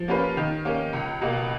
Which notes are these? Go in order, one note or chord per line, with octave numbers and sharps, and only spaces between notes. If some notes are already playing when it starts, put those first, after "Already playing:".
Already playing: F3
A#3 C#4 F4 B4
D#3
A#3 C#4
C#2
B2 A#3